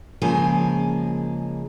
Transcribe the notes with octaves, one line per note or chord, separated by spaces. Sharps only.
C#3 F3 G#3 A#3 G#5